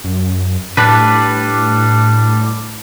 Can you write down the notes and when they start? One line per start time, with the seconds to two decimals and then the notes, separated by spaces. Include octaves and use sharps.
0.04 F#2
0.77 A2 G3 D4 B4